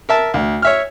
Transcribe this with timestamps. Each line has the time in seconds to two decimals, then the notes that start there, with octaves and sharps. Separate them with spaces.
0.09 A#4 E5 A5
0.34 D2
0.62 C#5 E5 F6